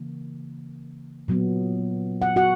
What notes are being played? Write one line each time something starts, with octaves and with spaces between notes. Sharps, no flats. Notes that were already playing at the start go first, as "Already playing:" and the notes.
Already playing: C#3 E3 A#3
A#2 F#3 B3
F#5
F#4 F#5